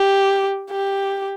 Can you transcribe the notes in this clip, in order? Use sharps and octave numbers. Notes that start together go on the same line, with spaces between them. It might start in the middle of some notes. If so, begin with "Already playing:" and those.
Already playing: G4
G4